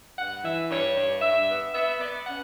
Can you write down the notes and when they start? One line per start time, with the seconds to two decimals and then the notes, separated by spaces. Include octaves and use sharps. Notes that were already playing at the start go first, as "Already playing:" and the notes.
0.17 G2 F#5
0.43 E3 E5
0.69 G2 C#5
0.95 G2
1.21 G2 E5
1.48 B3
1.73 B3 E5
1.99 B3 D5
2.25 C#4 F#5